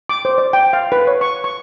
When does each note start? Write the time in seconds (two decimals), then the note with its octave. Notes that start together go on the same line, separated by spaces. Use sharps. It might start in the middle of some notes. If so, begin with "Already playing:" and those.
0.09 D6
0.25 C5
0.38 D5
0.53 G5
0.73 F5
0.92 B4
1.07 C#5
1.21 C#6
1.44 C#6